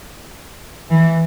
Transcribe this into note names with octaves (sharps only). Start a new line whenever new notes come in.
E3